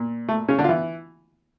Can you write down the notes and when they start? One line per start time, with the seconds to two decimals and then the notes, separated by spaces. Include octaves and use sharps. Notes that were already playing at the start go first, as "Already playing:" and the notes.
Already playing: A#2
0.28 A3
0.48 C#3 C#4
0.58 D3 D4
0.64 F4
0.69 E3 E4